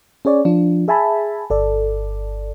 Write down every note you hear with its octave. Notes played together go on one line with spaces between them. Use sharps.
C#4 G#4 C#5 D5
F3 D4 F4
G#4 E5 G#5 A5 B5
G1 A4 D5